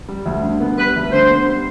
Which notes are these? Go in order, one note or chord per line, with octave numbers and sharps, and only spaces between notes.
G3
D2
D3
B3
G3 B4
D2
D3 C5
B3
G3